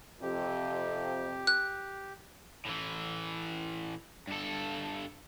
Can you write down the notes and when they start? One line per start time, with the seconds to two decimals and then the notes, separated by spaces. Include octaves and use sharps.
0.22 F2 C3 G4
1.47 F#6
2.65 A2 E3
4.28 G2 A4